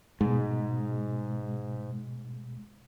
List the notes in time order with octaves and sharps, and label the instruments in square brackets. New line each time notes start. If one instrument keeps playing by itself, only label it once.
[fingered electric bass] G#2 [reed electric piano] B2 G#3